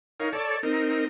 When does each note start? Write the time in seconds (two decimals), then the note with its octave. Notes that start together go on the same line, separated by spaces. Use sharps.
0.20 D#4 A#4 C#5 F5
0.33 A4 C#5 D5 A5
0.63 C4 D#4 A#4